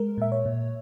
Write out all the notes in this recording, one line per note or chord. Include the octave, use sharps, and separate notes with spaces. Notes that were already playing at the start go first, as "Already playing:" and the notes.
Already playing: G#3 A#4
A#2 E5
C#5
A#2